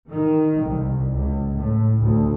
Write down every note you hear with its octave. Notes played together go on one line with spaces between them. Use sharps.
D#3
C2
C#2
A2
D2